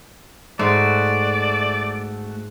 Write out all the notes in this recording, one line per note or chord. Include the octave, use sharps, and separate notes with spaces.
G#2 A3 F#4 D5